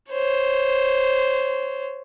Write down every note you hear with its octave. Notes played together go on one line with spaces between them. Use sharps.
C5 C#5